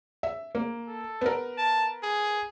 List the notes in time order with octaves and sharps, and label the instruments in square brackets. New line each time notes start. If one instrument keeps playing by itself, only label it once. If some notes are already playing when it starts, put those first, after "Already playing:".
[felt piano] E5
A#3
[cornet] A4
[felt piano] B3 A#4
[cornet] A5
G#4